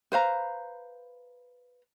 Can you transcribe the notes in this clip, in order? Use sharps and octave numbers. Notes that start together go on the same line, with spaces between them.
B4 C5 F5 A#5